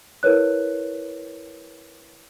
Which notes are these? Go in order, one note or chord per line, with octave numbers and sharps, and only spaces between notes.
E4 A#4 B4 C#5 F#6